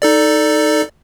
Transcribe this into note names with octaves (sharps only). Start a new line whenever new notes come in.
D#4 A4 D5